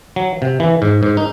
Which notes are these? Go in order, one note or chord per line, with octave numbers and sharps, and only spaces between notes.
F#3
C3
E3
G#2
G#2
D#4